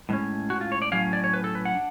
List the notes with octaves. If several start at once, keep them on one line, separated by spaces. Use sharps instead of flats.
A2 G#3 C#4
F#4
F4
C#5
D5
A2 F#3 C#4 F5
D5
C#5
B4
A4
B4
F#5
D4